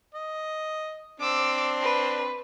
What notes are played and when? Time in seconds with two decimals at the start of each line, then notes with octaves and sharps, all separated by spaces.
0.14 D#5
1.20 C4 D4 D6 E6
1.82 B4